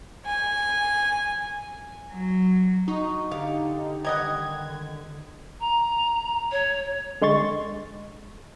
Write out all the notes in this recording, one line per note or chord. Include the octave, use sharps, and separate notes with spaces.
G#5
F#3
D#4 F#4
D3 G4 F5
D#3 G3 D#5 F#5 G#6
A#5
C#5
D3 G#3 C6 C#6 A6